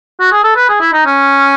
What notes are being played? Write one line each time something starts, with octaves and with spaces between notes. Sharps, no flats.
F#4
G#4
A4
B4
G#4
E4
D#4
C#4